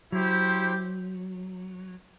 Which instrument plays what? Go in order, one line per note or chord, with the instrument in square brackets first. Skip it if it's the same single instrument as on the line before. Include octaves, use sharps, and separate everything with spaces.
[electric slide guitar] F#3 [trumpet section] E4 G4 C5